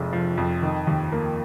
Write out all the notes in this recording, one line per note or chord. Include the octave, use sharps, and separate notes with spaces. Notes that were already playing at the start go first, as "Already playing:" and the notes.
Already playing: F1 F2 G#3
F3
F2
D#3
D#2
A#3